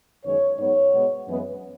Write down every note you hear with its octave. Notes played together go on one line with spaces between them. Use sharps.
F#2 D#3 G#3 B3 C#5
G#2 F#3 B3 C#5
B2 G#3 B3
F#2 E3 G#3 B3